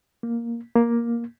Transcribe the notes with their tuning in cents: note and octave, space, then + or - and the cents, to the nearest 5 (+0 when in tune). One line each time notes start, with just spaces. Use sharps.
A#3 +5
A#3 +10